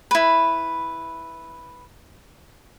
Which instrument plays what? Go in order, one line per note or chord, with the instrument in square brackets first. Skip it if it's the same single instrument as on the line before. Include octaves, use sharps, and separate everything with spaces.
[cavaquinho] E4 B4